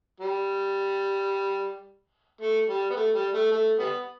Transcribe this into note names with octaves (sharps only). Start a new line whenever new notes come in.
G3
A3
G3
B3
A3
G3
A3
A3
G3 B3